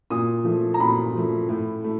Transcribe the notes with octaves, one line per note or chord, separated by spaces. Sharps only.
A#2 D#6
F3 A3
A#5
A#2 B5
F3 A3
A2
A3